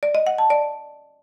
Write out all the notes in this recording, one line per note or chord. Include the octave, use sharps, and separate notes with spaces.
D5
D#5
F#5
A5
D5